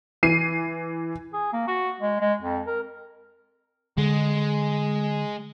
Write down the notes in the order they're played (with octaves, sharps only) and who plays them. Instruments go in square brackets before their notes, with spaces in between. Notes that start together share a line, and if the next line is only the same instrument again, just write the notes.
[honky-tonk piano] E3 C7 D#7
[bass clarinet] G#4
A#3
F#4
G#3
G#3
F2
A#4
[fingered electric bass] D3 [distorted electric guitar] G#3